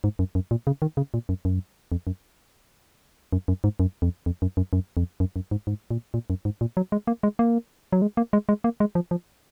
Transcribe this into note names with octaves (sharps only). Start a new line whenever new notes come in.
G#2
F#2
F#2
A#2
C#3
D#3
C#3
A#2
F#2
F#2
F2
F#2
F#2
F#2
G#2
F#2
F2
F2
F#2
F#2
F#2
F2
F#2
F#2
G#2
G#2
A#2
A#2
F#2
G#2
A#2
F#3
G#3
A#3
G#3
A#3
F#3
G#3
A#3
G#3
G#3
A#3
G#3
F3
F3